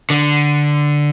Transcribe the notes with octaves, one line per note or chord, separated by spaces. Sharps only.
D3